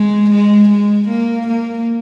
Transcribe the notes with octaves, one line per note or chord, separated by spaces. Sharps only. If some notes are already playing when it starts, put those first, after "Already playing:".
Already playing: G#3
G#3
G#3
A#3
A#3